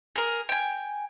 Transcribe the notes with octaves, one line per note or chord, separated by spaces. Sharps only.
G#4 A#4
G5 G#5